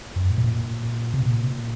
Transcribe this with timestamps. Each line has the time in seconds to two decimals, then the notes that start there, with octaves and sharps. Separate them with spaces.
0.16 F#2
0.30 A2
0.38 A#2
1.14 C3
1.25 A#2